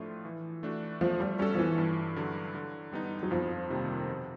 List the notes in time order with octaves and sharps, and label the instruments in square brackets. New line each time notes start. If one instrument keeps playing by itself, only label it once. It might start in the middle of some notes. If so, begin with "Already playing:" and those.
Already playing: [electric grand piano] A2 F3 A3 D4 F4
E3
A3 D4 F#4
[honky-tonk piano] F3 [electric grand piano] A3
[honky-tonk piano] G3
[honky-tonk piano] G3 [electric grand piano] C#4 F#4 A4
[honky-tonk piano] F3
E3
[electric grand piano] G2
D3 F#3
D3
G3 B3 D#4
[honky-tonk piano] F#3
[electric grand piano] F2 [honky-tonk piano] F3
[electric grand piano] C3 D#3 G3 A#3
B2